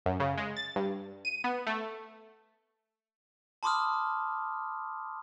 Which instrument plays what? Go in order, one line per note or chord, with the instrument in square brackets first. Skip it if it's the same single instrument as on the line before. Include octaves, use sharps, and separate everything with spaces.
[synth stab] F#2
C#3
G#3
A6
G2
D#7
B3
A3
[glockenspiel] A5 B5 C6 D6 D#6 F6